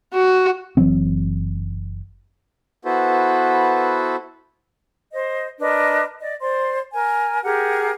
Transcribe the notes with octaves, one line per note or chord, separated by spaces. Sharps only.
F#4
F#1 E3 F#3 C4
B3 E4 F#4 A4 B4 C5
C5 D#5
D4 A#4 B4 D#5
D5 D#5
C5 D5 C6
A#4 G#5
G4 G#4 A#4 F#5